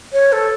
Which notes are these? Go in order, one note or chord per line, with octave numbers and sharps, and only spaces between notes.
C#5
A4